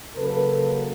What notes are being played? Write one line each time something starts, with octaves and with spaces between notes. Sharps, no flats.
C#3 F#3 A#3 A4 B4